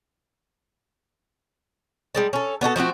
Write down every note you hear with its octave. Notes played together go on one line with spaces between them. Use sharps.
G3 G#3 A5
C#4 A4
B3 D4 F#4 A4
F3 A3 C4 F#4